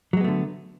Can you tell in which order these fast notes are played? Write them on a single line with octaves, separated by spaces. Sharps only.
F#3 G#3 B3 A3 D3